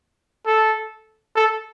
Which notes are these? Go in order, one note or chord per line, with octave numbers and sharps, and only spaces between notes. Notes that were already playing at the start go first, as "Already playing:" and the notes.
A4
A4